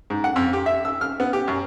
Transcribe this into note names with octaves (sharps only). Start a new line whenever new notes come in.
G#2
F#5
F2
G4
E5
E6
F6
B3
G4
F#2